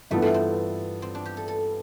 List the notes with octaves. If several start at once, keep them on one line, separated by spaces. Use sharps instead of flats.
G2 E3 A3 B3 F4 A4
A3
C4
C4
D4
G4
A4
A4